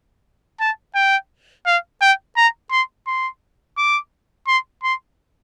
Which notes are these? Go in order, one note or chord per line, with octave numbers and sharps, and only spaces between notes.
A5
G5
F5
G5
A#5
C6
C6
D6
C6
C6